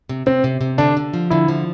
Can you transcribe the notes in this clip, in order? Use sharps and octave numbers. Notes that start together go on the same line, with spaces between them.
C3
C3 C4
C3
C3
D3 D4
D3
F3
D3 E4
F3